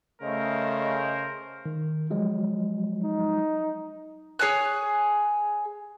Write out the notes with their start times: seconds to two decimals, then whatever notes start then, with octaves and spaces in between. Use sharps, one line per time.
0.22 C#3 A3 A#4 C5 D#5
1.66 D#3
2.10 F3 F#3 G#3
3.03 D#4
4.39 G#4 C#5 G#5 F#6